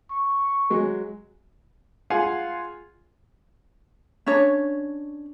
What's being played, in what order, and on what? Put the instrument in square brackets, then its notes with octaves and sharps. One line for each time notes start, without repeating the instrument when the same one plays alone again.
[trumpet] C#6
[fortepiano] F#3 G#3
F4 G#4 F5 F#5 G#5
[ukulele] C#4 D4 C#5